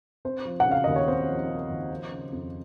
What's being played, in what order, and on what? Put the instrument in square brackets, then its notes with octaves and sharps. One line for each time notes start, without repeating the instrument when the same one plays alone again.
[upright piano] C4 C5
F3
F#5
C#3
F5
D#2 D#5
C#5
C4 C5
F3
C#3
D#2
F3
C#3
F2